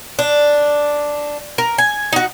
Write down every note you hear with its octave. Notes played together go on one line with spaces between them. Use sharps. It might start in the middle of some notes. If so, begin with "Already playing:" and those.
D4
A#4
G#5
D#4 F#4